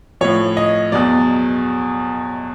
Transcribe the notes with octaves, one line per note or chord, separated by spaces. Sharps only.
A2 F3 C#5
D#5
E2 B2 F#3 D5